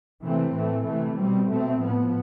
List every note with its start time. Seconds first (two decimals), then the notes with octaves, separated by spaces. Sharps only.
0.23 C3 E3 A3 C4
0.55 A2 E3 A3
0.87 C3 E3 A3
1.18 B2 G3 C4
1.49 B2 A3 C4
1.81 A2 F3 B3